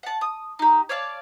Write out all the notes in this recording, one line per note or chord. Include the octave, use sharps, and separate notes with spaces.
F#5 A5
D#6
D#4 G4
C#5 D5 F5 A5